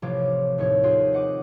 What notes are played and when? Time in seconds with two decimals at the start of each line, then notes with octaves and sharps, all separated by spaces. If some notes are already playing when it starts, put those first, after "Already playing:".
0.02 A1 C3 F3 C#5 F5 D6
0.58 D#2 A2 C#5
0.83 C4 F4 F#4 G#4
1.13 D#5 F#5 D6